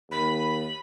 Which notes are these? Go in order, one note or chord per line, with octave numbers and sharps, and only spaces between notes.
D#2 B5